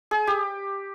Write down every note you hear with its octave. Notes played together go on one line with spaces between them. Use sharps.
G#4
G4